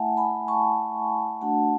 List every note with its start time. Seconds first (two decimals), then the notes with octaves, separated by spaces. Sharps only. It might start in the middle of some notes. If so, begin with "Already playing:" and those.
Already playing: A3 E4 E5 F#5 G#5 A5
0.17 G#5 B5
0.48 A5 C#6
1.41 A3 D4 F#4 F#5 A5